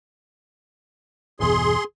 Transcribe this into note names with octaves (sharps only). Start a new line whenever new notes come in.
G1 E2 B2 G#4 C6